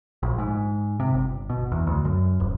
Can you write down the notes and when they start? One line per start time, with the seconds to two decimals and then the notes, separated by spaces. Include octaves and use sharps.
0.23 A#1
0.38 G#2
1.00 C3
1.14 G1
1.50 B2
1.72 E2
1.87 D2
2.05 F#2
2.40 D#1